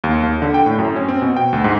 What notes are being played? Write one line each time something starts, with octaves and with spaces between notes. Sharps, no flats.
D#2
D#2
D3
G5
A2
F#2
C#4
C4
B2
G5
D2
G#2